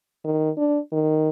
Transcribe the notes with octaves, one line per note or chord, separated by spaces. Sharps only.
D#3
D4
D#3